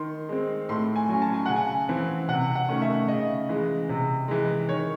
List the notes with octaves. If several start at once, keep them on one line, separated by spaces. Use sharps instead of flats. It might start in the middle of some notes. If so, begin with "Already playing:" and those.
Already playing: D#3 C6
G#3 C4
A2 C6
G#5
F#3 C#4
A5
G#5
C#3 F#5
G#5
E3 C4
C3 F#5
F#5
D#3 A3 C#4
E5
C#3 D#5
E3 G#3
C3
E3 G#3
D#3 C#5